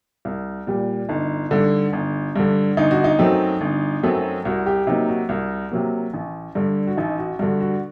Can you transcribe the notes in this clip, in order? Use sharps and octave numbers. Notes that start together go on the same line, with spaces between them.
C2
A#2 G3
G1 D#4
G2 D3
G1
G2 D3
G1 D#4
F#4
D#4
F#2 F#3 A3 C4
G1
F#2 F#3 A3 C4
C2 F#4
G4
C3 F#3 A#3 D#4
F#4
C2
C3 F#3 A#3
A1
G2 D3
F#4
A1 D#4
F#4
G2 D3 F#4
F#4